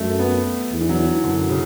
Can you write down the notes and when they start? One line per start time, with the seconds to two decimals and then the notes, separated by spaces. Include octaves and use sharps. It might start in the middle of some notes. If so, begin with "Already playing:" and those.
Already playing: F#2 A3
0.19 B3
0.71 E2
0.81 E3
0.89 F#3
1.07 E3
1.23 F#2 D3
1.49 C#3